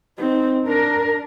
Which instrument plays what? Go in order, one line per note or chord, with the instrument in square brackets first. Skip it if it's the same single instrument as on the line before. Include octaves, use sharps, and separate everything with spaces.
[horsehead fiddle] C4 D#4
[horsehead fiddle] D4 [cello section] A#4